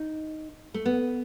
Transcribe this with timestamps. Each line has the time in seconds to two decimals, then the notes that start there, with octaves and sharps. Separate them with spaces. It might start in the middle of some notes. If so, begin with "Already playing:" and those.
Already playing: D#4
0.74 A3
0.86 B3